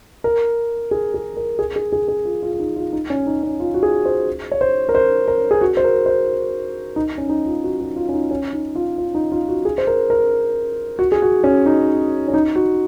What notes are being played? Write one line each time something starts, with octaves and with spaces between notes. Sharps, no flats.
A#4
G#4
G#4
A#4
G#4
G#4
G#4
G#4
F4
F4
F4
D#4
F4
D#4
C#4
D#4
C#4
F4
F#4
G#4
C5
C#5
C5
A#4
C5
A#4
G#4
F#4
C5
A#4
C5
D#4
C#4
D#4
F4
F#4
F#4
F4
C#4
D#4
C#4
D#4
F4
F4
D#4
F4
F#4
G#4
C5
A#4
A#4
F#4
G#4
F#4
C#4
D#4
C#4
D#4
F#4